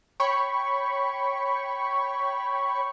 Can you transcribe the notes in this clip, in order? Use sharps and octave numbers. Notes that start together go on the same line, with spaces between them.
C#5 G5 B5 C#6